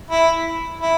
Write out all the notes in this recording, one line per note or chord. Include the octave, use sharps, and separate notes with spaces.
E4
E4